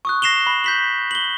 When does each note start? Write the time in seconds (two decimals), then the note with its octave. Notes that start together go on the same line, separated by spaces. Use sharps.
0.05 C#6 D#6 F#6
0.22 A#6 C7 E7 F7 G7
0.47 B5
0.64 G6 B6 F#7
1.11 F#7 G7